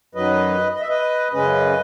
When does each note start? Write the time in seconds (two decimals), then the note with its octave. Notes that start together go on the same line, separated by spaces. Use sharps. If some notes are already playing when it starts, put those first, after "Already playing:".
0.15 F#2 D#3 F#3 B4 D#5
0.74 D#5
0.81 E5
0.89 B4 D#5
1.33 F#2 C#3 G#3 C#4 B4 D#5